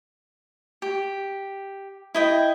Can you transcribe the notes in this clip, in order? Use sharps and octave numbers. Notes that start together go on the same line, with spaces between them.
G4
E4 D#5 G5